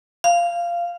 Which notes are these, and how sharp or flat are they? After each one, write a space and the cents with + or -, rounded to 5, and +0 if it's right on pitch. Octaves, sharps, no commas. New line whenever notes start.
F5 -15